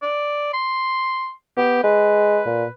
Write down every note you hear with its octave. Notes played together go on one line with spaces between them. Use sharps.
D5
C6
B3 G4
G#3 B4
A#2